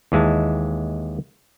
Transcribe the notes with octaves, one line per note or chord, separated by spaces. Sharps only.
D#2 E3 G#3 E5 A5